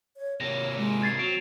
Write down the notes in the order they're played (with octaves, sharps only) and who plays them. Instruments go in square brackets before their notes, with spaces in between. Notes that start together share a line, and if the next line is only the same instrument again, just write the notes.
[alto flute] C#5
[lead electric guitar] C3 A#3 [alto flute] C#5 [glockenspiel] A#6
[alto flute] G#3
[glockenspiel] G#6 A6 C7
[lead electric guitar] F#3 [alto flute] C4 [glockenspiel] D7 F7